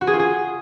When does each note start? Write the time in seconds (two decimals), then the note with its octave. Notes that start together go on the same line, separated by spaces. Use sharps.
0.01 F#4
0.07 G#4
0.13 F4
0.19 G#4